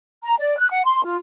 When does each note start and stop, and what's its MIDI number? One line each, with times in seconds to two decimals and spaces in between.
0.24 0.35 82
0.39 0.55 74
0.58 0.68 90
0.71 0.82 78
0.85 1.01 84
1.04 1.16 65